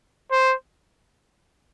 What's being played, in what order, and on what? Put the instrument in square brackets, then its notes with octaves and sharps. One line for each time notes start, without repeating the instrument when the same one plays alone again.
[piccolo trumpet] C5